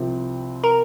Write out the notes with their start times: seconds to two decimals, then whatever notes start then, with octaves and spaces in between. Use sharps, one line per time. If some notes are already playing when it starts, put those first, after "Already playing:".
Already playing: C2 C3 F3 C4
0.64 A#4